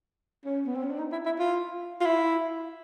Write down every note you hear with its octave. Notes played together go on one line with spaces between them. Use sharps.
C#4
B3
C4
C#4
D4
D#4
E4
E4
F4
F4
E4